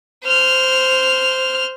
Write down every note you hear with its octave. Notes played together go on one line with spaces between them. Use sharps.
C5 F6